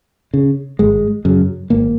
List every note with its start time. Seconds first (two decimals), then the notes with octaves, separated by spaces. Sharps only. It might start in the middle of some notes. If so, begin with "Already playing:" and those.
0.34 C#3
0.79 G#1 G#3
1.25 F#2 C#3
1.70 G#1 A#3